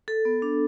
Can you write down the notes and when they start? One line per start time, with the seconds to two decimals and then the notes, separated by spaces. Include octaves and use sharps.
0.08 A4
0.25 B3
0.42 D4